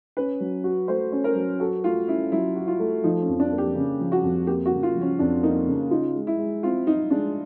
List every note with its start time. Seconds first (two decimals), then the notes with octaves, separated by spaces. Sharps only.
0.17 C#4 B4
0.40 F#3
0.64 F#4
0.88 A3 C5
1.12 C#4
1.24 A#4
1.36 F#3
1.60 F#4 A4
1.84 A3 F4
2.08 C#4 E4
2.32 F#3 E4
2.56 F#4
2.68 F4
2.80 A3
3.04 F3 D#4
3.22 C#4
3.28 F2
3.40 D4
3.52 A#3
3.58 G4
3.75 C#3
4.00 F3
4.12 F#4
4.23 F2
4.47 A#3 G4
4.66 F#4
4.72 C#3
4.83 F4
4.95 F3
5.01 C#4
5.19 F2 D4
5.43 A#3 D#4
5.67 C#3
5.91 D#4 F4
6.15 G#3
6.27 E4
6.38 G#3
6.63 C4 F4
6.87 D#4 F4
7.11 G#3 D4